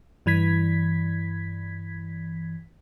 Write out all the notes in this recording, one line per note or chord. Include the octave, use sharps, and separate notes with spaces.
G2 E3 G#6 B6